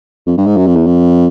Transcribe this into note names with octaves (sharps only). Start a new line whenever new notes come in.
F2
G2
G#2
F#2
F2
E2
F2